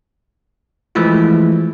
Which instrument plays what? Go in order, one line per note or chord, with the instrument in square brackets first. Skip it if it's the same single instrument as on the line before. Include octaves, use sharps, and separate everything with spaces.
[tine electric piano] E3 F3 G#3 A3 E4 F4